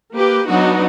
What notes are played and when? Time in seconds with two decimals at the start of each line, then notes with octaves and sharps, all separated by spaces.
0.14 A#3 G4 B4
0.46 F#3 B3 D4 D#4 F#4